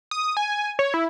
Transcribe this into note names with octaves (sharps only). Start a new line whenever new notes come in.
D#6
G#5
C#5
E4